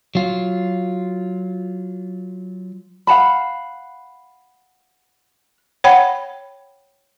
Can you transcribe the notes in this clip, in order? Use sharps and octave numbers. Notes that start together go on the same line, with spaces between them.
F#3 F4
F5 F#5 A5 B5
C#5 F#5 G5 B5